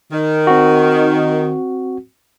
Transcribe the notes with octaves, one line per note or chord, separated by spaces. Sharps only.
D#3
C4 F#4